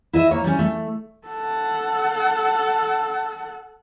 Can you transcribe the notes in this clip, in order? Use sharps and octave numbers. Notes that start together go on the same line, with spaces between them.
E4 D#5 E5
A#3 C#5
G3 C#4
A3
A4 F#5